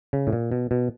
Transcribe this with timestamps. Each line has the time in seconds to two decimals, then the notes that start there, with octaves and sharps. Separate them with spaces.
0.13 C#3
0.27 A2
0.33 A#2
0.52 B2
0.71 B2